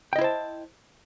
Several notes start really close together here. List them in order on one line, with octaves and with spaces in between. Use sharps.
G5 D#5 E4 C5 A5